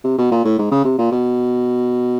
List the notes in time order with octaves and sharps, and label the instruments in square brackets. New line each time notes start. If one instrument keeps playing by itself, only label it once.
[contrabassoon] C3
B2
A#2
A2
G#2
C#3
C3
A#2
B2